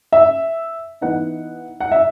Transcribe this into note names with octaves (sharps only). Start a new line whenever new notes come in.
E5
E3 B3 D#4 F#5
F#5
E5